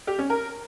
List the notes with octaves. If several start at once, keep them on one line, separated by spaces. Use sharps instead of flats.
G4
C#4
A#4